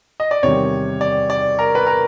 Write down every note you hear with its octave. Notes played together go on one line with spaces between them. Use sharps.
D#5
D5
E2 C3 D#3 G3 C#5
D5
D5
A#4
B4
A#4